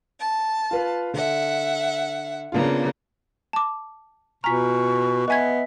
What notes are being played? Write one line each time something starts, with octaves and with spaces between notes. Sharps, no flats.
A5
F4 B4 F5
D3 E5 F#5
C#3 A#3 B3 D4 F4
A5 D6
B2 F4 G#5 A#5 C#6 F6 B6
B3 B4 D#5 E5 G#5 G#6 B6